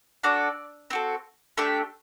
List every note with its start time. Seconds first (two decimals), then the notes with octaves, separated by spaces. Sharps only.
0.23 D4 F#4 A4 D5
0.90 C4 F#4 A4
1.57 A3 D4 G4 E5